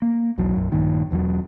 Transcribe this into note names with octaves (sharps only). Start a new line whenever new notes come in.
A#3
B1 E2 F#3
B1 F#2
A#1 G2 A#2 D#3
E1 E2 E3 F#3